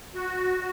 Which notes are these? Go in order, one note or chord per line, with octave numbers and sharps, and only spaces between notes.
F#4